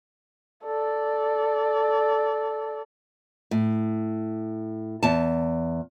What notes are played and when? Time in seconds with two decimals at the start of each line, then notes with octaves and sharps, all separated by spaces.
0.64 A4 D5
3.51 A2
5.03 E2 A5